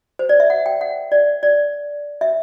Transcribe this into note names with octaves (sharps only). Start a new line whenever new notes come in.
C5
D5
E5
F#5
G5
F#5
D5
D5
E5